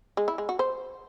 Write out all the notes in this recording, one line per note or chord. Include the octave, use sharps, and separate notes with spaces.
G#3
E4
G#3
F#4
C5